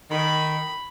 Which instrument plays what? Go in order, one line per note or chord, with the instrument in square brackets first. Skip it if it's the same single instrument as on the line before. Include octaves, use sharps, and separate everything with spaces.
[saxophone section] D#3 [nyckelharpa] B5